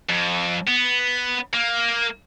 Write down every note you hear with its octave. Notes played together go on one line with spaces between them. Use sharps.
F2
B3
A#3